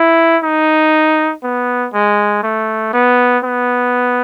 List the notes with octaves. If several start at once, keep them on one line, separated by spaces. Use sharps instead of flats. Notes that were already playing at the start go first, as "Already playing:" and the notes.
Already playing: E4
D#4
B3
G#3
A3
B3
B3